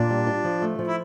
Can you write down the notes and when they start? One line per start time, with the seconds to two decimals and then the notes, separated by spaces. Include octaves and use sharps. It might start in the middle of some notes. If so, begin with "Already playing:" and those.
Already playing: A#2 D4
0.10 G3
0.27 F4
0.44 F3
0.62 A3
0.79 F3
0.87 E4